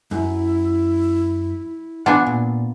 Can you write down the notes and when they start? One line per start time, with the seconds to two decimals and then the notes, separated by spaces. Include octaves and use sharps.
0.11 F#2 E4
2.06 B3 D4 F4 F#5 G#5
2.27 A#2